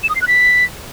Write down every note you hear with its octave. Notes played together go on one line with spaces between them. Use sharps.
E7
D#6
C7
F#6
B6